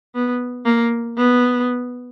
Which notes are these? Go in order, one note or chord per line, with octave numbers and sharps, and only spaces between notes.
B3
A#3
B3